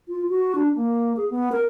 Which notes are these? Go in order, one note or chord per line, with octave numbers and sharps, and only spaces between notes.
F4
F#4
D4
A#3
G#4
B3
A#4